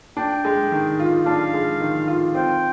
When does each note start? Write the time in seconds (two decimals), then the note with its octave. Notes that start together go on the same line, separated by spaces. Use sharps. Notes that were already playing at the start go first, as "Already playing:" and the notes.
0.17 D4 G5
0.45 G#3
0.72 D#3
1.00 F4
1.26 D4 F5
1.54 G#3
1.80 D#3
2.08 F4
2.35 C4 G5